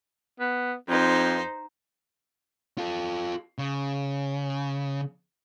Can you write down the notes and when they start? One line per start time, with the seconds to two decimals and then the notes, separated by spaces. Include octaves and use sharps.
0.40 B3
0.88 F2 D#4 C5
2.78 F4 A4
3.58 C#3